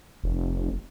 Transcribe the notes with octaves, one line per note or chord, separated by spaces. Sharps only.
F1